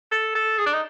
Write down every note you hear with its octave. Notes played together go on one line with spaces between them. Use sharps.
A4
A4
G#4
D4
D#4